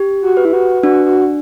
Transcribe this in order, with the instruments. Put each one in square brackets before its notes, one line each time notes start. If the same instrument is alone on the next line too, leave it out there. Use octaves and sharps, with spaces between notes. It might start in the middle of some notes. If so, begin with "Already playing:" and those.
Already playing: [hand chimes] G4
[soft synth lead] F#4
[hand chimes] B4
[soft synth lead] E4
F#4
[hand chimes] D4 [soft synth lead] F#4
[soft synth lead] F#4